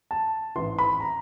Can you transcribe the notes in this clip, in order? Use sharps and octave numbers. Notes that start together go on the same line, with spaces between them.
A5
A1 G#2 E3 C6
B5
A#5